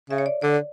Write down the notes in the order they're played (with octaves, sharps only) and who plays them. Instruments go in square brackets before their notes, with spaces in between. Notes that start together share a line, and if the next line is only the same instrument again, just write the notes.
[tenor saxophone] C#3 [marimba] E5
[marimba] C#5
D5
[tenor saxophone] D3 [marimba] D5